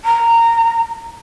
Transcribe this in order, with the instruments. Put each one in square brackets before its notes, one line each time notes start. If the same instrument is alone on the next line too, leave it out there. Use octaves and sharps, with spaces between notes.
[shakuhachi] A#5